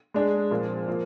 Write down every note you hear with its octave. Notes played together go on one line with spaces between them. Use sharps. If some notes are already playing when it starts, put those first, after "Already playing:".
G#3 D4 G#4
A#2 F3 C4
F3 A#3 F4